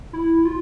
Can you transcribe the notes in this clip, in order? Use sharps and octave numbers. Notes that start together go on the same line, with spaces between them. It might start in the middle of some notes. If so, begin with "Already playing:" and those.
E4
F4